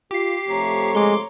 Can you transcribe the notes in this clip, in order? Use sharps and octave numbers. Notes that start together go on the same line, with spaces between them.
F4 G4 C7
C3 F3 A3 C#5 A#5
G#3 C6 D6